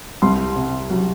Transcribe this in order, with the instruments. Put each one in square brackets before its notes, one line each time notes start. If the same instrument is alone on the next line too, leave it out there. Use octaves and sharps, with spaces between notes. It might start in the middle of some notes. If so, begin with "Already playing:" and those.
[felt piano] C2 C6
C3
F#3